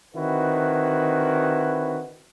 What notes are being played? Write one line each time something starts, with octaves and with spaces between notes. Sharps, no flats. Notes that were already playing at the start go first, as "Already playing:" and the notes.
D3 D#3 C4 E4 F#4 B4